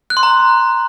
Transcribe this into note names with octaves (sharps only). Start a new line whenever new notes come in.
F#6
C6
A#5